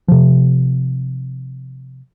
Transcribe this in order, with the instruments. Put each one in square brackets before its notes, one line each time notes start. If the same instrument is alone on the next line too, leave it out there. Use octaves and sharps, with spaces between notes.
[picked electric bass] C3 F3